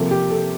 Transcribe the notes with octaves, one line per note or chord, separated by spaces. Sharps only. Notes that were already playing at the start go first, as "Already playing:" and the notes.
Already playing: C3 F3 A#3 A4
G4
A4